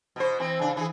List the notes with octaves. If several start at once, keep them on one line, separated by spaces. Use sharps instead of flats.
B2 C5
E3 C4
C#3 D4
E3 G#4